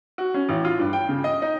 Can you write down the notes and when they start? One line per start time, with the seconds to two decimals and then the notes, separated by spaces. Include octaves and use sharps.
0.18 F#4
0.34 C#4
0.49 A1
0.65 F4
0.79 G2
0.93 G5
1.09 C#3
1.24 D#5
1.42 D#4